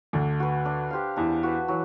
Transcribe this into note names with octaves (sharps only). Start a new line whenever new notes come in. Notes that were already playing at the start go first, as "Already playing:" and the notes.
D2 D3 D4
F#4 B4
D4
G4 C5 F5
E2 E3 D4
F#4 B4
E3 F#3